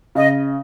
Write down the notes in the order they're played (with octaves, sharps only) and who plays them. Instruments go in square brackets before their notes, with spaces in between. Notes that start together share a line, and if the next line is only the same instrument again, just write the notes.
[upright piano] C#3 [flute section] D#5